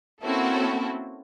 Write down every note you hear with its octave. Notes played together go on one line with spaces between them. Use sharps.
A#3 C4 C#4 E4 F#4 A4